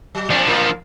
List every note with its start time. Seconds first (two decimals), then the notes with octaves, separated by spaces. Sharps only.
0.15 F#3
0.30 F3 C4 D4 D5
0.46 A2 A#3 F4